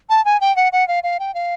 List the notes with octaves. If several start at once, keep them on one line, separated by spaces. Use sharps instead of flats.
A5
G#5
G5
F#5
F#5
F5
F5
G5
F5